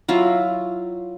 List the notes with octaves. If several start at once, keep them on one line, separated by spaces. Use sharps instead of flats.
F#3 E4 F4